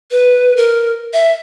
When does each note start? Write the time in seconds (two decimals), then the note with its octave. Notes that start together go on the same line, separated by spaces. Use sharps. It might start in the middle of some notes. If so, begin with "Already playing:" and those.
0.11 B4
0.57 A#4
1.13 E5